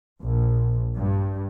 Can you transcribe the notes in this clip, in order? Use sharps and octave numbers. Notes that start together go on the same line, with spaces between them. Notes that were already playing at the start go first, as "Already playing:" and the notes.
A#1
G2